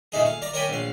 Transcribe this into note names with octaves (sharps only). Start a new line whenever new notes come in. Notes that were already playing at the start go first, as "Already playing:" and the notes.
A#2 A3 D#4 G#4
F5
D5 A#5
A#4 C#5 D5 G5 G#5 B5
A#1 F5